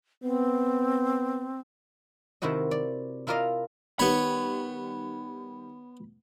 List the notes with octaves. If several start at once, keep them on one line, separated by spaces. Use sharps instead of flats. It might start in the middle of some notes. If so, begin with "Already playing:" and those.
B3 C4
C3 D#3 E4 F#4 D#5
D5
E4 F4 A#4 D5 D#5 F5
D#3 G3 B3 C#5 B5